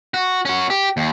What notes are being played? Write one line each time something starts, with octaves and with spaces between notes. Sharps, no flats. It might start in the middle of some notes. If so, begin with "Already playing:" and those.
F#4
C#4 F#4
G4
D#2